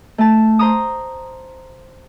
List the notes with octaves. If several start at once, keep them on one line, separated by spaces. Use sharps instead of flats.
A3 A5
C5 A#5 D#6